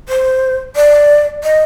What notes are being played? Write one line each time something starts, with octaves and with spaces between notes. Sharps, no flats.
C5
D5
D#5